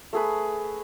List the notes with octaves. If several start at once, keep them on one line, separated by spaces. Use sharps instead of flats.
A3 G#4 B4